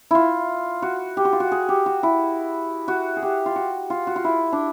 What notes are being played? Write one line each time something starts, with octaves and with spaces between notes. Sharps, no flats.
E4 F4
F#4
G4
F#4
F4
F#4
G#4
G4
F#4
E4
F#4
G#4
G4
F4
F#4
F4
F#4
F4
E4
D4